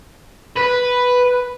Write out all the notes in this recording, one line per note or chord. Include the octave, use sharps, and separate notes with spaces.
B4